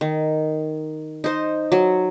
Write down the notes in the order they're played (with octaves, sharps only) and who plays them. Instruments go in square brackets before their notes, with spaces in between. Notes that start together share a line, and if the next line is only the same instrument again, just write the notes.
[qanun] D#3
D#4 C5
F#3